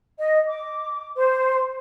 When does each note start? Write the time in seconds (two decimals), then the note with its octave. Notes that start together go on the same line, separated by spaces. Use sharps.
0.19 D#5
0.48 D6
1.15 C5